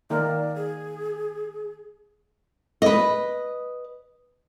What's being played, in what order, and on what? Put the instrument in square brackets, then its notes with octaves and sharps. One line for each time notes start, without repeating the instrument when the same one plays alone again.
[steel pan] D#3 A#3 A#4 [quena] D5
[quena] G#4
[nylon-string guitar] B4 D#5